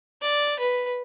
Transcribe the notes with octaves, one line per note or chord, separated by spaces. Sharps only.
D5
B4